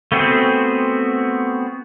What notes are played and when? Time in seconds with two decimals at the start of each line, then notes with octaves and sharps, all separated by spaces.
0.12 A3 B3 C4 F#4 G#4